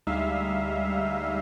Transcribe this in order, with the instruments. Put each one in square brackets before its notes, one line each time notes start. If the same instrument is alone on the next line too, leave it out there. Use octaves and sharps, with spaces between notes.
[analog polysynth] D2 G3 G#3 D#4 E5 F5